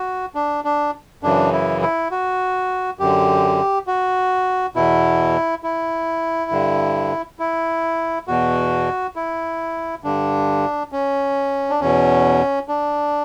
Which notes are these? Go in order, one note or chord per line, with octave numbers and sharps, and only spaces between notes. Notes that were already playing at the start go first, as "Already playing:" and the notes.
Already playing: F#4
D4
D4
F#2 C#3 E3 D4
E4
E4
F#4
F#2 D3 G4
F#4
E2 B2 E4
E4
G2 D3
E4
E2 B2 F#4
E4
G2 D3 D4
C#4
D4
E2 B2 C#4
D4